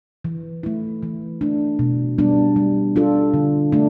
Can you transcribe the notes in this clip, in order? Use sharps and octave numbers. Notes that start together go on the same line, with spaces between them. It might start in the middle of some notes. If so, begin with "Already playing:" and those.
E3
A3 E4
E3
A3 D4
B2
G3 B3 D4
G3
D4 F4 A4
D3
A3 D4